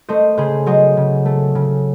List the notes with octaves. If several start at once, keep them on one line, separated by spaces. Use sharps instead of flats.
A3 C5 D#5
C#3 G#4 C5
F#3 C5 D#5
C#3
A3
C#3